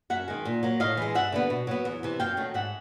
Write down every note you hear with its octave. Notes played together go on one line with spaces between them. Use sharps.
F#2 E5 F#5
D#3 G#3
A#2
F#3 A#3
A2 D#5 F5
E3 G#3
G2 E5 F#5
D3 G3 B3
B2
F#3 B3
E2
C3 E3
F#2 F5 G5
D#3 F#3 A3
G#2 E5 F#5